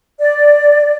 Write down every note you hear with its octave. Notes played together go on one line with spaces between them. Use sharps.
D5